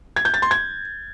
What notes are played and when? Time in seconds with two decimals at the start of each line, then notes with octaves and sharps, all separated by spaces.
0.16 G#6
0.25 G6
0.34 A6
0.42 C6
0.51 G#6